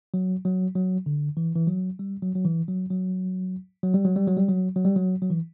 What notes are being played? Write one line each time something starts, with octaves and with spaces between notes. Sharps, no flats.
F#3
F#3
F#3
D3
E3
E3
F#3
G3
F#3
F#3
E3
F#3
F#3
F#3
G3
F#3
G3
F#3
G3
F#3
F#3
G3
F#3
F#3
E3